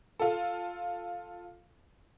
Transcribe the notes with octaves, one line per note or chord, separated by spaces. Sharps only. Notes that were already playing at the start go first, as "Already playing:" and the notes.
F4 A4